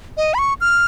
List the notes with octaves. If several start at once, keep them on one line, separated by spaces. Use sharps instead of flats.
D#5
B5
C#6
F6